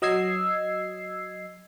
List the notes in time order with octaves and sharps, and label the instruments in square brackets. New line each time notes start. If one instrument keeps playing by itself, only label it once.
[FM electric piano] F#3 D#5 E6 G#6 C7